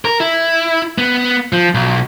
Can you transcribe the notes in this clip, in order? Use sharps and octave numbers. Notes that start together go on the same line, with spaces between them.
A#4
E4
B3
F3
B1